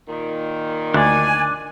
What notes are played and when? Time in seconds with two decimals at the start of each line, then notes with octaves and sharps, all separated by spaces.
0.08 A#2 D#3
0.94 D2 D4 D5 G#5